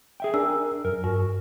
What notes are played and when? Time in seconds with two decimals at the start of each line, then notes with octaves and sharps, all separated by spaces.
0.20 G#4 E5 G5
0.34 D4 A#4 G#5 E6
0.85 F#2 A#4
1.04 G2 F#4